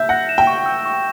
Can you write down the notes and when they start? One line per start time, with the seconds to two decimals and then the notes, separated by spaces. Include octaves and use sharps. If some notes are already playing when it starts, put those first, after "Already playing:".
Already playing: E5 G6
0.09 F#5 A#6
0.29 E7
0.38 G5
0.47 C#6
0.66 E6
0.86 C#6